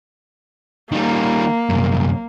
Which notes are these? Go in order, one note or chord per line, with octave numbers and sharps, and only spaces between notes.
D#3 G3 A#3
C2 F#2